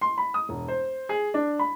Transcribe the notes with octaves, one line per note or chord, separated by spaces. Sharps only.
C6
B5
D#6
E1
C5
G#4
D4
B5